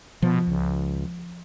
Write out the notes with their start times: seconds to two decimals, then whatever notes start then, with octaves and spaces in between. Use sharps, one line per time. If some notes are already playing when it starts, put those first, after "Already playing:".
0.22 B2 F3
0.48 C#2